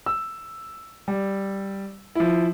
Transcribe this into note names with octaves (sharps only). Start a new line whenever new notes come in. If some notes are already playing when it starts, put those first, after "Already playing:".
E6
G3
F3 E4